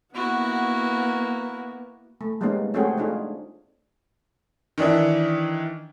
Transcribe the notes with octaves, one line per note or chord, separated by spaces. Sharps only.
A#3 B3 E4 F#4
A3
G3 G#3 A#3 B3 C#4 D#4
A3 C4 C#4 F#4 G#4 G5
A3 D4 D#4 F4 G#4
D#3 E3 D4 E4